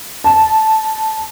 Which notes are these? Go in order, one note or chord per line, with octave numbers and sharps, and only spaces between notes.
A5